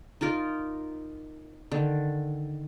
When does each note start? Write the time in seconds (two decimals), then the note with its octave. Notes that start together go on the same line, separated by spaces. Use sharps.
0.21 D#4 F4 A#4 D5
1.71 D3 D#3